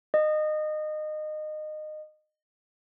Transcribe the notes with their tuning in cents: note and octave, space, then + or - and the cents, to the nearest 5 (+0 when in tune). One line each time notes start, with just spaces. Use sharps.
D#5 -20